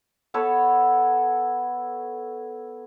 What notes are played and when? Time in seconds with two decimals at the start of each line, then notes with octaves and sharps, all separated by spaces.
0.34 B3 A4 B4 C#5